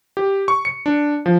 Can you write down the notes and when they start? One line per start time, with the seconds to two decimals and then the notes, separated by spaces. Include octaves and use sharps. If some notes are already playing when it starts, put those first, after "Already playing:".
0.17 G4
0.48 C#6
0.65 C#7
0.86 D4
1.26 F3